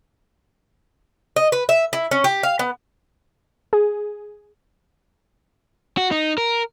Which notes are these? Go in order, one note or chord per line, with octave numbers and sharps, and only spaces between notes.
D#5
B4
E5
E4
C#4
G4
F5
B3
G#4
F#4
D#4
A#4